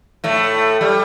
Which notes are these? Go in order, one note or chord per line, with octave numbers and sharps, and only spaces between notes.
A2 A3
G3